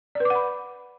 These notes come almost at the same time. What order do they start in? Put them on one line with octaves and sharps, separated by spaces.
D5 B4 D6 F#5 B5